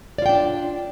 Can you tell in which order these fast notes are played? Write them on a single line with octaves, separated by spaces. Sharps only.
D5 F4 G5 D4